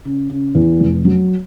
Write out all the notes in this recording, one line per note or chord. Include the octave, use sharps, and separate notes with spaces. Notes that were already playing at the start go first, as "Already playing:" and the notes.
C#3
C#3
E2
F1
F#3